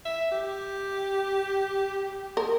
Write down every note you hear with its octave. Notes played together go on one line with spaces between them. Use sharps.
E5
G4
A#4